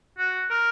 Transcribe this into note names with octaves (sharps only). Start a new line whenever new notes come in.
F#4
A#4